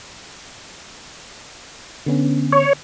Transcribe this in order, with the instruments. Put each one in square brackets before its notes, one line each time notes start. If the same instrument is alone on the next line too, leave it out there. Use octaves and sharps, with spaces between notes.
[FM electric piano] D3 B3 C#4
[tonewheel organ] C#5